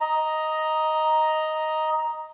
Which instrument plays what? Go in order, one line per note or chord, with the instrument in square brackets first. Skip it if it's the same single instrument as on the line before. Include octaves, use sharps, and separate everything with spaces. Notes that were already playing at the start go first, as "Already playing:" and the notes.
[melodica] D#5 A#5